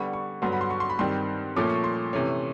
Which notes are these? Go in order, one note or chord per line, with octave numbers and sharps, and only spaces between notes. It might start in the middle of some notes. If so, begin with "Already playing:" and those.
Already playing: D3 G3 B3 C#6
C#6
G2 D3 F#3 B3 C6
B5
C6
C#6
C6
B5
G2 D#3 G3 C4 C6
A#2 F3 A3 C#4 D6
C#6
C6
C3 E3 A3 C#4